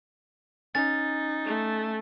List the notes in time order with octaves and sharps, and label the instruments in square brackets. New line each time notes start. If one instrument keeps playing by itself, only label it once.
[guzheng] C#4 [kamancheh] D#4 [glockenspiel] A6
[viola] A3